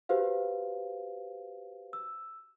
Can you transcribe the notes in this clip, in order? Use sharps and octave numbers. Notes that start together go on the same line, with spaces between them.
F#4 G4 B4 C5 F5
E6